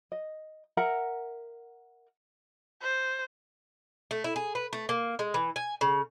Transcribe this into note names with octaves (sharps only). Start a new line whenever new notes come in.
D#5
A#4 E5 F#5 A#5
C5
A3
E4
G#4
B4
A3
A#3
G#3
E3
G#5
C#3